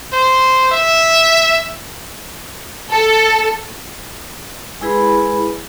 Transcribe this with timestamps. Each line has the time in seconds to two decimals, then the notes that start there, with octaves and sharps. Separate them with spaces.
0.13 C5
0.72 E5
2.91 A4
4.81 G#3 E4 G#4 B4 B5